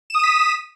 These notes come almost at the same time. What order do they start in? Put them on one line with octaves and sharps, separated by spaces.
E7 D#6 D#7 B6